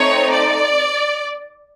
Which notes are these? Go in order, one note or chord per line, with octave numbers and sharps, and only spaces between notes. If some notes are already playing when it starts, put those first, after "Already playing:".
Already playing: A3 C4 D#4 C#5
D5